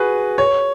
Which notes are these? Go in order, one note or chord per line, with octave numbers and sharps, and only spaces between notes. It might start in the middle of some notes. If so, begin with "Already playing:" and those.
Already playing: F#4 G#4 B4
C#5